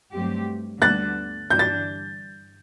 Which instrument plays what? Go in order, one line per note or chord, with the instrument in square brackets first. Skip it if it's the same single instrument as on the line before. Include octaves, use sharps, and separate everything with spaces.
[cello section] G2 F#3 A3 C4 G4
[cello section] D2 D3 G3 B3 D4 [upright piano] F#6 A6
[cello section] G2 E3 G3 D4 [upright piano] G6
[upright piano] A6